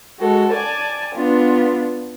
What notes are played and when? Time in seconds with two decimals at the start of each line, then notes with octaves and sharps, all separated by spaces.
0.19 G#3 F#4 A4
0.51 D5 G#5 A5
1.14 B3 D4 F4